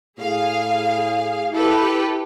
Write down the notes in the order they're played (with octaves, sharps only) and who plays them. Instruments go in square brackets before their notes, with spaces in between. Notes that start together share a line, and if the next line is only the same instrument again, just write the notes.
[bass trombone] A2 [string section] G#4 F5
[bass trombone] E4 [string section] G4 A4 B4